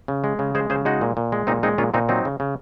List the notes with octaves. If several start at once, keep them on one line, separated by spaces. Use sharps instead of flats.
C#3
G#3
C#3
G#3 G#4 C5
C#3 G#4 C5
G#3 D#4 F#4
A#2
A#2
G#3
A#2 C4 D#4
G#3 C4 D#4
A#2 C#4 F4
A#2 C4 D#4
F#3 C4 D#4
C#3
C#3